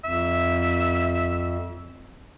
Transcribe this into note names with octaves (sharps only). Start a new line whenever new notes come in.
F2 E5